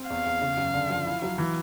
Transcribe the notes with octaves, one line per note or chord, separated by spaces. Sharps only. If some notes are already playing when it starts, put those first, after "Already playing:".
Already playing: C4
E2 F5
E2
C#3
F#2
D3
F3
E4
F#3
E3